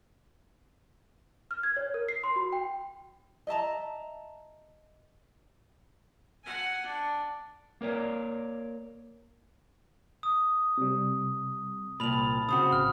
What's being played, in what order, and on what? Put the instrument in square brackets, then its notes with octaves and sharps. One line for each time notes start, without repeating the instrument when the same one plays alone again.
[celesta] F6
G#6
C#5
A#4
C7
C6
F#4
G5
[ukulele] D#5 E5 A5 A#5
[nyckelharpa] F#5 G#5
D4
[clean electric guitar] A#3 A#4 C#5 D5
[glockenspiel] D#6
[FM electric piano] C3 G3
[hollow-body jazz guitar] C2 A#2 [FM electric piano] A5 F6 A6 [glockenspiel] B5 F7
[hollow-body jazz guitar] C#3 C4 F#4 [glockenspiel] D#6
[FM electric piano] A1 [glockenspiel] F6